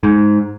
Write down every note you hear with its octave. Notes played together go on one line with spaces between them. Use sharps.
G#2